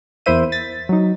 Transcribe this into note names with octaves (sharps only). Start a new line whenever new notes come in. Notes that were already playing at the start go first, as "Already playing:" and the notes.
E2 A#3 E4 C5 E5 D#7
A6 B6
F#3 D#4